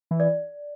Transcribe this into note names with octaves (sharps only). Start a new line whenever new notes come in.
E3
D5